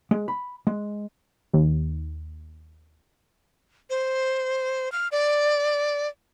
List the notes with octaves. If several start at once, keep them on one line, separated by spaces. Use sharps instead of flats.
G#3
B5
G#3
D#2
C5
F6
D5